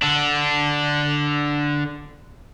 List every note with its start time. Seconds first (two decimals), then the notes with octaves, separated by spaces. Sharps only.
0.02 D3 D4